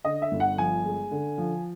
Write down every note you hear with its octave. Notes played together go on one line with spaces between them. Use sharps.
D3 D#5
E5
G1
F#5
F3 G#5
G#3
D3
F3